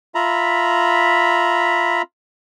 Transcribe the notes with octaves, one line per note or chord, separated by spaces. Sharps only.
F4 E5 A#5 B5